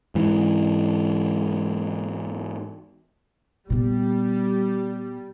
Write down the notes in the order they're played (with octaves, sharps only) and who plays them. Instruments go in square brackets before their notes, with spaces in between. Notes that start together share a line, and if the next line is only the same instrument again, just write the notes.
[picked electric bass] G#2 E3
[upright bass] A#2 B3 [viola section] G3